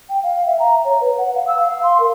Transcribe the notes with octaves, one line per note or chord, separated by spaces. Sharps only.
G5
F5
E5
A#5
C#5
B4
F#5
F5
E6
F5
C6
A#4